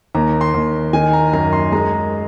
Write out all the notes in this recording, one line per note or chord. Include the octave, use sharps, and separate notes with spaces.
D#2 A#5
C6
D#2
D#3 G#5
A#5
F#2 A#5
C6
G#3 A#5